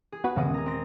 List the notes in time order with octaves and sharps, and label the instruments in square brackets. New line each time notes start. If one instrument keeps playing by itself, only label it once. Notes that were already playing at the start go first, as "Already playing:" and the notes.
[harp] G#4
[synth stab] B3 F#4 B4
[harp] D#1 G#3 D#6 [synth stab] G2 C#3 B3
[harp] G#4 A#5
C4 A#6